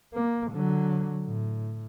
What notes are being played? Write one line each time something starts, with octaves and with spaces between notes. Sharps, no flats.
A#3
D3 F#3
A2